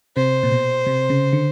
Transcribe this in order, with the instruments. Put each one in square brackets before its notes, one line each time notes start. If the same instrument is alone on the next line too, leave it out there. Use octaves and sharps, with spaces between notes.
[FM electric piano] C3 [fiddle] C5
[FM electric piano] A#2
B2
C3
C#3
D3